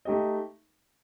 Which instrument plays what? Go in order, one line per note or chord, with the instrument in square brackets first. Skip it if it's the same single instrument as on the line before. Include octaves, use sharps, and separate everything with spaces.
[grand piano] A3 D#4 G4 D#5